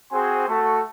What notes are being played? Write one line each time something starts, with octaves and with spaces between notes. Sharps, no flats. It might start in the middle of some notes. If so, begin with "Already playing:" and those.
C4 F#4 G#4 C5 G#5 C6
A3 F#4 A4